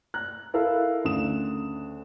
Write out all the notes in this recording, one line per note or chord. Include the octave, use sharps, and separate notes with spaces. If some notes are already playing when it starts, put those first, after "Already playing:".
A#5 F#6
E4 A4 A#4 F5 E6
D2 C#3 D#6 E7